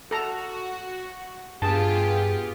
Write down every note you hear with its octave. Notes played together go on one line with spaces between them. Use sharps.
F#4 A4 A#5
G2 B3 F4 G4 G#4 A5